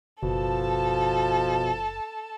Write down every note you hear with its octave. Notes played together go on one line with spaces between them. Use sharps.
F#1 B2 F3 A4 A5